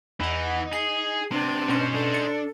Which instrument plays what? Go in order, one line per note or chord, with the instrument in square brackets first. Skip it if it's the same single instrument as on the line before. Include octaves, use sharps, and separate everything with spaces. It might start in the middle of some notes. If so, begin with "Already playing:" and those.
[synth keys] E2 F#5 [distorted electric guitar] E3 [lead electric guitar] D#4
[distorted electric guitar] G#4 [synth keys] C7
[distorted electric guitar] C3 [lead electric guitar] B3 C4 [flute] D4
[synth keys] B2 C#4 C#7 [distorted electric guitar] D#4 C5
[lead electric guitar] D4 [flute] A4
[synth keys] A6 C#7